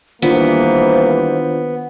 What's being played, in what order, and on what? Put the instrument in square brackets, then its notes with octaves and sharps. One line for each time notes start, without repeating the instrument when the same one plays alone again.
[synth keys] D#3 D4 F4 [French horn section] E3 G3 A#3 [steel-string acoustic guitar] B3 [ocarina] C5